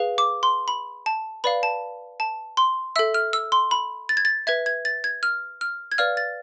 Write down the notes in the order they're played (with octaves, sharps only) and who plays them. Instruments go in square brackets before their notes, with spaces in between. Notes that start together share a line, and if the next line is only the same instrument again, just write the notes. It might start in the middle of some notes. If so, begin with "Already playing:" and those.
Already playing: [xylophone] G#4 B4 F5
D6
C6
B5
A5
B4 D5 F5 B5
A5
A5
C6
A4 E5 E6
F6
E6
C6
B5
A6
G#6
A6
B4 E5 G#6
G#6
A6
G#6
F6
F6
G#6
B4 D5 F5 F6
A6